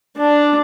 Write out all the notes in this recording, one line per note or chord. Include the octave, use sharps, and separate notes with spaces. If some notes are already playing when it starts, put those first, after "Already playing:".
D4